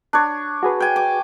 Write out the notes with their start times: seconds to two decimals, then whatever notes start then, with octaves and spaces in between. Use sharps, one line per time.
0.13 D4 C#5
0.63 F#4 G#4 B4
0.80 G5 G#5
0.96 D6